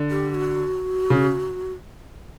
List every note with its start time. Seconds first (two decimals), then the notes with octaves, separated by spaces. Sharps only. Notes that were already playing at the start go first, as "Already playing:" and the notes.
Already playing: D3
0.10 G4
0.30 G4
0.35 F#4
1.10 C#3